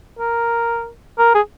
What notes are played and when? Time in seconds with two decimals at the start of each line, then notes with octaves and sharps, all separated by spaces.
0.19 A#4
1.18 A#4
1.35 G#4